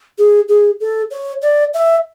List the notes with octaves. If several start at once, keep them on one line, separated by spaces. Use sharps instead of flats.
G#4
G#4
A4
C#5
D5
E5